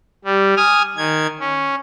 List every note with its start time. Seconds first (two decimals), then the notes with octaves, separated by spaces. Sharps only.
0.24 G3
0.57 G#5 D#6 F6
0.97 D#3 G#6
1.40 C#4